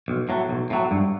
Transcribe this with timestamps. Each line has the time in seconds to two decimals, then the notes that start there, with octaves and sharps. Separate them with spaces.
0.08 B1
0.29 A2 F#3
0.49 B1
0.70 A2 F#3
0.91 G2